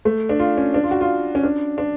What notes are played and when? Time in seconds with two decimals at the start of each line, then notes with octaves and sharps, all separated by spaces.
0.05 A3
0.29 D4
0.39 F4
0.57 C#4
0.74 D4
0.84 F4
0.91 F#4
1.01 F4
1.35 C#4
1.43 D4
1.78 D4